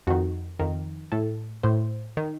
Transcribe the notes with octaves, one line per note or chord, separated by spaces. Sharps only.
F2 D#3 F#4
F2 D#3
A2 A4
A2 C5
D#3